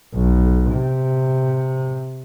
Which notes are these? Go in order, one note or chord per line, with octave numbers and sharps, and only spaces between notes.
B1
C3